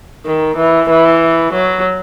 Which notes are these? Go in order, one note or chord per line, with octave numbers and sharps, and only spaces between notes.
D#3
E3
E3
F#3